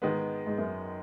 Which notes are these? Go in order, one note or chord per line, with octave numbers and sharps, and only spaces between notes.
G#2 D#3 G#3 B3
G#2
F#2